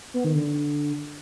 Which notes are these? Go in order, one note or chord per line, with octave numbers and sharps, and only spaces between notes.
B3
D#3
D3